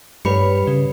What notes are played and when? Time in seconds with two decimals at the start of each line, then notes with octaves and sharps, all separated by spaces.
0.25 G2 G3 B4 C#5 B5 C#7
0.67 C#3